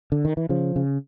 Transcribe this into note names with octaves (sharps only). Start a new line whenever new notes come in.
D3
D#3
E3
C#3 F3
C#3